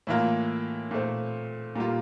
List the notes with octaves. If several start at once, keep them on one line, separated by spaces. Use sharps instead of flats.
A2 E3 A#3 F4
A#2 A3 C4
A#2 G3 A#3 F4